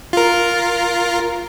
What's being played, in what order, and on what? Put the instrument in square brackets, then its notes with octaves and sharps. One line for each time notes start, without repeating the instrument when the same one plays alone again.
[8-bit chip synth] F4 A#4